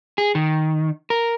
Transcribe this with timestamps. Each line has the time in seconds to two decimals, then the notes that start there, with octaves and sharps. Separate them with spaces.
0.18 G#4
0.35 D#3
1.10 A#4